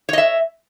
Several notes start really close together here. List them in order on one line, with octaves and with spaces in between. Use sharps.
C#5 D#5 E5